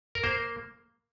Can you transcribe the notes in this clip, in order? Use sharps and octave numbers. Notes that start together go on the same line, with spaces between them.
A#4
A#3 C5